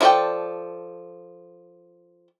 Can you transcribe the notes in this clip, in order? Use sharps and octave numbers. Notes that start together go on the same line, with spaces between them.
F3 E4 A4 D5 G5